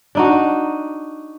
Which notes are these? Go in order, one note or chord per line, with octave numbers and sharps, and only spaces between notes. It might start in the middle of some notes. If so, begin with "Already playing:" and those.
D4 D#4 F#4